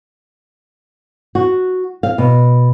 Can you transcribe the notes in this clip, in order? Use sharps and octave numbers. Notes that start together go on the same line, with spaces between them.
F#4
F5
B2